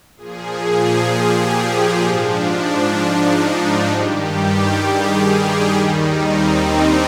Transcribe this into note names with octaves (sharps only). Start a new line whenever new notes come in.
A#2 F3 G#4
G4
G#2 F3 D4
D#4
G2 D#3 G3 G4
G#4
G4
D#2 D#3 G3 D#4
C4
D4